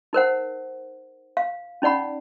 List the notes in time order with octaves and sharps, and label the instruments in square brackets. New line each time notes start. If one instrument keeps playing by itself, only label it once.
[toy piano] D#4 A#4 C5 F#5
F5
C#4 D#4 D5 F#5 B5